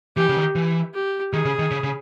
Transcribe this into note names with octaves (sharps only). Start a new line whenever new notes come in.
E3 G4
C#3
D#3
E3
G4
D#3 G#4
C#3
D#3
C#3
C#3